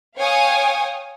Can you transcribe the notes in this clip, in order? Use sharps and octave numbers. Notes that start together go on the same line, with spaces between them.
C#5 F5 G5 G#5 C#6 D#6